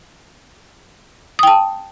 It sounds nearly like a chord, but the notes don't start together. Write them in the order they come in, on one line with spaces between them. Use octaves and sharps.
D#6 G5 A5